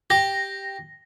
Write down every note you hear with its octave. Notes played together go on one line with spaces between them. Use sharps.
G4 A#6